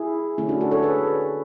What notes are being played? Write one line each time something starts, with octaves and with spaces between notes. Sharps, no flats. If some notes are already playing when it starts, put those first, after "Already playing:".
Already playing: E4 G#4
D3 A3 C#4 E4
D4 F#4
F#4 A4
A4 C#5
G#4 B4